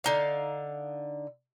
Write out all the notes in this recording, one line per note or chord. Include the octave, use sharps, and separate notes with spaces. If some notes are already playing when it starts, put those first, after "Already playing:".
D3 D#4 F5